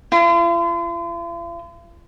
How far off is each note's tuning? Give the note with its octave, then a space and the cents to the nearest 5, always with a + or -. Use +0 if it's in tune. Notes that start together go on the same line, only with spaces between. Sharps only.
F4 -45